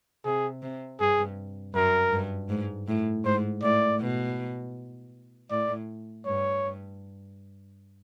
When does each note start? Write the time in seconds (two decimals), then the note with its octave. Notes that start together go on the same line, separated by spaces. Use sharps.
0.24 C3 G#4
0.62 C3
1.00 G2 G#4
1.74 F#2 A#4
2.12 G2
2.49 G#2
2.88 A2
3.25 G#2 C5
3.63 A2 D5
4.00 B2
5.50 A2 D5
6.25 G2 C#5